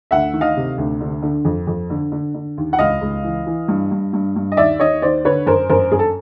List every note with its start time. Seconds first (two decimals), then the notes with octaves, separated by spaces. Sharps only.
0.11 D2 E5 F#5
0.33 D#3
0.41 D#5 F5
0.57 C3
0.78 D2
1.01 D3
1.23 D3
1.45 F2
1.67 F2
1.90 D3
2.12 D3
2.35 D3
2.57 D#2
2.73 F#5
2.79 C#2 D#5 F5
3.01 C#2
3.24 E3
3.47 E3
3.68 G2
3.91 G2
4.13 G2
4.36 G2
4.52 D#5
4.57 D#2 D5 E5
4.80 D#2 C#5 D#5
5.02 D#2 C5 D5
5.25 D3 B4 C#5
5.46 F#2 A#4 C5
5.70 F#2 A#4 C5
5.91 F#2 G#4
5.99 A4